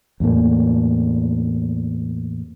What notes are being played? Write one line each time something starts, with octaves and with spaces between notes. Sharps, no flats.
E2 A2 A#3